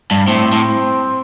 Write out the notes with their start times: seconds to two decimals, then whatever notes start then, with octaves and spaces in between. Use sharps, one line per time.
0.11 G2
0.27 A2 C4
0.52 A2